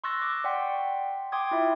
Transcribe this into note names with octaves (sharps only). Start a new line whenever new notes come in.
C6 C#6 E6 F#6 A6 A#6
C#6 D6
D5 F#5 G5 C6 B6
G5 C6 D6 D#6 G#6
E4 F4 E5